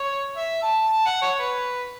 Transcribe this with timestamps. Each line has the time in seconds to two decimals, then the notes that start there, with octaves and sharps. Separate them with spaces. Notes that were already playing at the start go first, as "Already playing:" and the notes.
Already playing: C#5
0.36 E5
0.62 A5
0.88 A5
1.05 F#5
1.22 C#5
1.39 B4